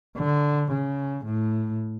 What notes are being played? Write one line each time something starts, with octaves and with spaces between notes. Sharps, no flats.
D3
C#3
A2